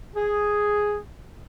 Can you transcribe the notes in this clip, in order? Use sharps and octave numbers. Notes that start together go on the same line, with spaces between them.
G#4